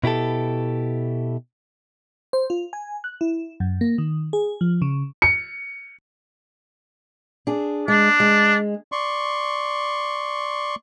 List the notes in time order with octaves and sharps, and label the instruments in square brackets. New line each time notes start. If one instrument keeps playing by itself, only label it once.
[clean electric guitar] B2 E4 G4 A4
[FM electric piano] C5
F4
G#5
F#6
E4
F#2
A#3
D#3
G#4
F3
C#3
[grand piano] C#7
[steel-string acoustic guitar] D4 G#4
[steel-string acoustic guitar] G#3 [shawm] D4
[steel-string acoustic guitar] G#3
[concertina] D5 C6 C#6